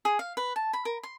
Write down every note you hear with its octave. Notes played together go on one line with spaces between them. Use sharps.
G#4
F5
B4
A5
B5
A#4
C6